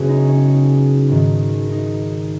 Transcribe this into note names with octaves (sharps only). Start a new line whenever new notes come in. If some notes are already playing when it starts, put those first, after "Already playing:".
Already playing: F#1 F#2 C#3 B3 C#4 F#4 G#4
D#4
C#4
G#1 G#2 D#3
D#4